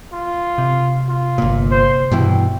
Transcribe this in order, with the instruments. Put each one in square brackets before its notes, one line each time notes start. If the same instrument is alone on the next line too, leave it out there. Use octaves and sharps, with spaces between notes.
[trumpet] F4
[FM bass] C3
[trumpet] F4
[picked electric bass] G1 A#2
[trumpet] C5
[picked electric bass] G2 B2 E3 [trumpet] G5